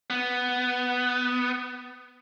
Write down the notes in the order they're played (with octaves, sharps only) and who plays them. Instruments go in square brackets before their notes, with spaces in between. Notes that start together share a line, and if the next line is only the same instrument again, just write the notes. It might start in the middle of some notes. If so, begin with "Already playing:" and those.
[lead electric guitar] B3